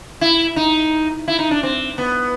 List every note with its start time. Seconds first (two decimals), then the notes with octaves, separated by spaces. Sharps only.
0.21 E4
0.56 D#4
1.28 E4
1.39 D#4
1.51 D4
1.63 C4
1.98 B3